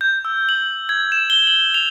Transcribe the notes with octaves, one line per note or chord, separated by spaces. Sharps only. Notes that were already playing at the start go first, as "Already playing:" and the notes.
G6
E6
F#7
G#6
E7
G7
F#7
F7